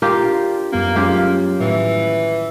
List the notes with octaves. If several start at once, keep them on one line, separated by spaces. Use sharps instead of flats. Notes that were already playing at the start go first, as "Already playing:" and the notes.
F4 G4 A#4
D4
F#2 G3 A#3 B3
F#3 G#3 C#4 F4 G4 F5
A2 D#3 E3